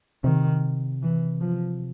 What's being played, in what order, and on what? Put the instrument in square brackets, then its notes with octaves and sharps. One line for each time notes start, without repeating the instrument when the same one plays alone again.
[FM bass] C3 [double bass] D#3
[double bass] E3
F3